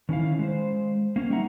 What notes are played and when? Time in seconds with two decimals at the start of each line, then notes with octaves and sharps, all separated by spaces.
0.09 D#3 C#4 E4 F5
0.39 G#3 C5
1.16 A#3 C#4
1.30 G3 G#3 D#4 E5 F#5 A#5